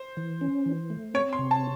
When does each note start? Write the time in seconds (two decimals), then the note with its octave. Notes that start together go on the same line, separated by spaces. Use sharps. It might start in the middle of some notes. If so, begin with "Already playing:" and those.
Already playing: C5
0.17 E3
0.41 C#4
0.66 E3
0.90 A3
1.14 C4 C#5
1.33 C6
1.39 C3
1.51 A5